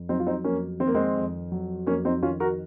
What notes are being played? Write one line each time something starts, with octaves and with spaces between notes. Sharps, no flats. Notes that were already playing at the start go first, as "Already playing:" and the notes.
Already playing: F2
F#3 C4 D#4
F4
C4 D#4
F2 A#3 C#4
D#3 C4
A#3
G#3 C4
F2
F#3
F2 A#3 C#4
C4 D#4
D#3 C#4 F4
F#4 A#4